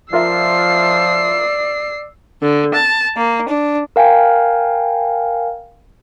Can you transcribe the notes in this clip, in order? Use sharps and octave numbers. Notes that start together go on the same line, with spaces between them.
F3 F4 A#4 D5 E5 E6 C7
D3
A5
A#3
D4
A#4 F5 G5 G#5